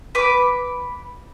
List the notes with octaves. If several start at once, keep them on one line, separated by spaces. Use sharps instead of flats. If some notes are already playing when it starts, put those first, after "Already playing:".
B4 D6